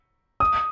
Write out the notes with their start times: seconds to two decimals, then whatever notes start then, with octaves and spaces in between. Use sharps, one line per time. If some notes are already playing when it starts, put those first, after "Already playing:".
0.40 D#6